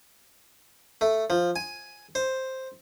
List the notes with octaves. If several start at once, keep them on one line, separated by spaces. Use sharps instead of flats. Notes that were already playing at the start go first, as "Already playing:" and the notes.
A3
F3
G#5
C5